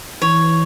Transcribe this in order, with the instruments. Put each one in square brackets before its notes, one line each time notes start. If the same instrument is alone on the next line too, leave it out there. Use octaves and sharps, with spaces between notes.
[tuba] E3 [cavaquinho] C#5